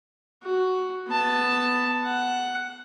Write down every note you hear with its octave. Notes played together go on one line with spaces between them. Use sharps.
F#4
B3 A5
F#5